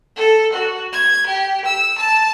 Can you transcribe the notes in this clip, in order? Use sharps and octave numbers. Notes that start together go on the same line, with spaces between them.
A4
F#4
G#6
G4
E6
A5